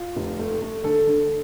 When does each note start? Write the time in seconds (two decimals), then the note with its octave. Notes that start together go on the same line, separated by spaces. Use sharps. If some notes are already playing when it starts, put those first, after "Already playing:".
Already playing: F4
0.16 F1
0.39 A3
0.62 A3
0.84 D3 A4
1.07 D3